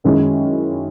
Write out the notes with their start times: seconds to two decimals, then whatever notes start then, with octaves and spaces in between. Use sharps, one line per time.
0.04 F#2 D#3 G#3 C#4 E4